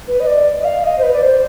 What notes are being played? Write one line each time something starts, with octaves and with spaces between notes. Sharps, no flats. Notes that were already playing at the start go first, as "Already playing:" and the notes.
B4
D#5
D5
D#5
F5
D#5
C5
B4
D5
C5